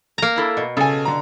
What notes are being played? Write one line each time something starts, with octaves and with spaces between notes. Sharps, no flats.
A#3 A#5
D4 E4 A4
B2
C#3 A4 G#5
D3 A#5